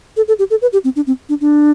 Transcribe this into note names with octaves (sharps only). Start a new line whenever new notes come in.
A4
A4
G4
A4
B4
G4
C4
D4
C4
D4
D4